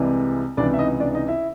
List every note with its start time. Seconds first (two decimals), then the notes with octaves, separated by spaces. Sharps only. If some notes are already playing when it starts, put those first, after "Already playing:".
Already playing: C2 C3 E3 G#3
0.57 C#2 C3 E3 D4 D5
0.74 E5
0.79 D#4 D#5
1.00 D4 D5
1.14 D#4 D#5
1.28 E4 E5